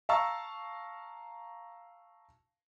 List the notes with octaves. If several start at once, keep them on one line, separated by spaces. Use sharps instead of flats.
F5 A5 A#5 C#6 E6